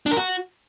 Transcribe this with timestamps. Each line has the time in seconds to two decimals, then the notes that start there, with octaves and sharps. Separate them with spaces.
0.06 D4
0.11 A#4
0.17 F#4